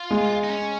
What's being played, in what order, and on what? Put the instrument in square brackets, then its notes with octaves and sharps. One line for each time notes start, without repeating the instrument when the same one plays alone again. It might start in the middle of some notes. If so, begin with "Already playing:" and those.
Already playing: [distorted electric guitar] F4
[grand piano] G#3
[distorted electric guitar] D#4
C#4